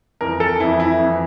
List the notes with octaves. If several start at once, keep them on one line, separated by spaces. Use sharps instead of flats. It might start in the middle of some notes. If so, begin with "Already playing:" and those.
F2 E3 A#4
A4
F2 E3 E4
E4
F2 E3